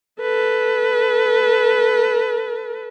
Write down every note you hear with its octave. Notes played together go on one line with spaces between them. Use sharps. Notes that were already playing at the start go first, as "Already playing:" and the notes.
A4 B4